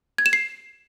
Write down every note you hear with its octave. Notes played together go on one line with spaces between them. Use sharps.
G#6
E7
C7